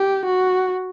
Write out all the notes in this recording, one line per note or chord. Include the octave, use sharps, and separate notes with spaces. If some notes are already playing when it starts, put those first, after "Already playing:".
Already playing: G4
F#4